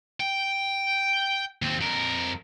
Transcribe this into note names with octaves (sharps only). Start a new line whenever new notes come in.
G5
D#2 C4
F2 A#4